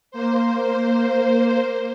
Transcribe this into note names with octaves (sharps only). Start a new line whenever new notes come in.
A#3 C5